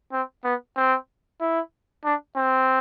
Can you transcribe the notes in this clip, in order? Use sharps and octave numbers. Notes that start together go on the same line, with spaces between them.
C4
B3
C4
E4
D4
C4